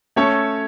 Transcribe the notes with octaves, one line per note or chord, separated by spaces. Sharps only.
A3 C#4 A4 C#5